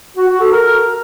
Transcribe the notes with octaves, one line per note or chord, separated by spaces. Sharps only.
F#4
F#4
A4
A#4